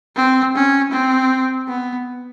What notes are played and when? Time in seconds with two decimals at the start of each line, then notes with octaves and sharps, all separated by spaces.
0.16 C4
0.55 C#4
0.92 C4
1.68 B3